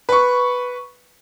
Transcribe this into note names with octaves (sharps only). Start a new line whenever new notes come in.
B4 C#6